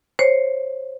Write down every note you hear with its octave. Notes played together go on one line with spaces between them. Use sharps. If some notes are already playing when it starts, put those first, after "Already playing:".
C5 C#5